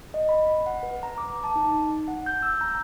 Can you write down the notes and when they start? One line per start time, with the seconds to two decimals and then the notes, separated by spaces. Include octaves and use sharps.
0.14 D#5
0.29 B5
0.66 F#5
0.83 B4
1.03 A#5
1.18 D6
1.44 A5
1.56 D#4
2.08 F#5
2.26 G6
2.42 E6
2.61 A#5